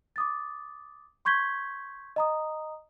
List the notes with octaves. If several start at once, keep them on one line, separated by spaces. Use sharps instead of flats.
D6 D#6 A6
C6 C#6 G6 G#6 B6 G7
D#5 A#5 D#6